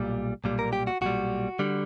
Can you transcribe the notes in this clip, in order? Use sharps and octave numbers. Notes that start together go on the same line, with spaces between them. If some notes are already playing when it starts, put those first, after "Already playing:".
Already playing: B1 A#2 G3
B1 A#2 G3
A#4
G4
F#4
B1 A#2 G3 F#4
D3 G3